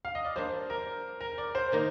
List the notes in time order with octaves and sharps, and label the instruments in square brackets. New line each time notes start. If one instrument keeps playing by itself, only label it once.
[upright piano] F5
D#5
D5
[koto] G3 A#3 D4 [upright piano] C5
[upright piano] A#4
A#4
D5
C5
[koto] D#3 A#3 D#4